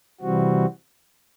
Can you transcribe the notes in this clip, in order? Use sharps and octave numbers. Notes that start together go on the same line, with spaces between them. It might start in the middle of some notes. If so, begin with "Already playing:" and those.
C3 E3 G3 C4 F#4